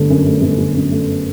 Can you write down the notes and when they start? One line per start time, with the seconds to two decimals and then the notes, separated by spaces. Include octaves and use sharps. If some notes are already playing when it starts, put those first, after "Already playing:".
Already playing: G1 D3 A3
0.10 F#2
0.26 A3
0.42 G1
0.58 D3
0.75 F#2
0.91 A3